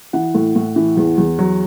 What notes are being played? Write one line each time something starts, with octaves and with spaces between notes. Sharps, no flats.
E3 F#5
A2
A2
E3
E2
E2
F#3